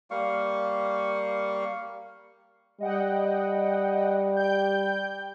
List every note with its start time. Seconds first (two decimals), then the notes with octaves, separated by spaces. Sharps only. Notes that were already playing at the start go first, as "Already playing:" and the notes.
0.11 G3 A#3 F5 C#6
2.80 G3 D#5 F#5 G5
4.37 G5 G6